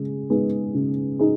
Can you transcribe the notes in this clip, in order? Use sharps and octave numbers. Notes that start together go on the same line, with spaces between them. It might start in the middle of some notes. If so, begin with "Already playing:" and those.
Already playing: C#3 G#3 G#4
G#3 B3 D#4 G#4
C#3
D#4 G#4